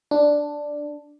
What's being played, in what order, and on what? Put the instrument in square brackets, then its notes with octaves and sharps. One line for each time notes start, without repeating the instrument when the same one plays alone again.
[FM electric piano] D4